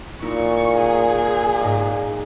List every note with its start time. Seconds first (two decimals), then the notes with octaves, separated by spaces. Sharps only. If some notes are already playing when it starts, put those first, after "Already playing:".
0.22 A#2 D#4 E4 C#6
0.77 G#4
1.61 G#2 D#5